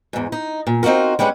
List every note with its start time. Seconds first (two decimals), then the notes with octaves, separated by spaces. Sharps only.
0.13 E2 G#2
0.32 D#4
0.67 A#2
0.83 C4 D#4 F4 F#4 A#4
1.19 G3 G#3 C#4 B4 D#5 F#5